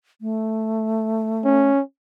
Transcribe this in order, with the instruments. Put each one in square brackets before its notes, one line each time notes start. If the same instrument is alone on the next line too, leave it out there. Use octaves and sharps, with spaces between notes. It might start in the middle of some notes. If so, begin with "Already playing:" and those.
[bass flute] A3
[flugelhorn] C#4